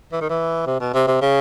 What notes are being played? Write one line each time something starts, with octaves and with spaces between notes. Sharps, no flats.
E3
D#3
E3
C3
B2
C3
C3
C#3